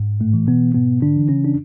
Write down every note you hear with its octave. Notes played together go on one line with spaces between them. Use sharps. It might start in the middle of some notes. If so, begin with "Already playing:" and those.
Already playing: G#2
A2 A3
E3
B2 B3
G#2 B2 B3
D3 D4
E3
C#3 C#4
D4